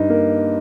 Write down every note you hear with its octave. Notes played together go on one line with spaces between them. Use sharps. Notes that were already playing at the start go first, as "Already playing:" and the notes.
Already playing: G2 D#4
A#3